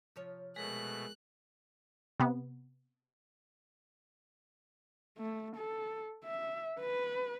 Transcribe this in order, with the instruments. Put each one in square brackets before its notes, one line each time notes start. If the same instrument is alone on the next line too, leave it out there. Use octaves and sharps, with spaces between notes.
[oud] C3 F3 C#5
[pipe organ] B2 A3 [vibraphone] G#3 G#4 A#4 [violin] F#6
[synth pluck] C3 B3
[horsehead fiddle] A3
A4
E5
B4